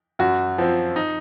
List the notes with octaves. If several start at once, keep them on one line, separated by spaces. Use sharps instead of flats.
F#2 F#4
F3 C4
D#4